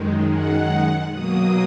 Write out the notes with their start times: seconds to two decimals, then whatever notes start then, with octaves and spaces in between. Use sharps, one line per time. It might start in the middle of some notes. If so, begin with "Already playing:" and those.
Already playing: F#2 D#3 G#3
0.31 F#5
1.09 B2 F#3 A#3 D#6